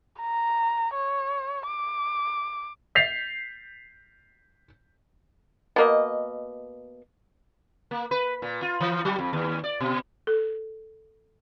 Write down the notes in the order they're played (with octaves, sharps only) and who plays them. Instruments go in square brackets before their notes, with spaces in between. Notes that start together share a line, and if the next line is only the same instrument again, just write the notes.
[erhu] A#5
C#5
D6
[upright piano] G6 A6 B6 C7 F7
[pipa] B2 A#3 D#5
[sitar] A#3
B4
A#2
F4
E3
F#3
F2
D#2
D5
B2
[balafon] A4